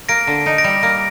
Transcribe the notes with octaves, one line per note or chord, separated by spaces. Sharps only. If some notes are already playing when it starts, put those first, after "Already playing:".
A#3 A#6 D7
D3
D#4
A#6 D7
G3
A#3 A#6 D7